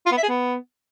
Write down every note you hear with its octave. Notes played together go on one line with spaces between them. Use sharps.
F4
B3
E5
G#4
B3